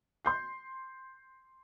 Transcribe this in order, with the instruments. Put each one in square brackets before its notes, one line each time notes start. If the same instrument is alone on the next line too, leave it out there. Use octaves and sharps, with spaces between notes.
[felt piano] C6 G6 C7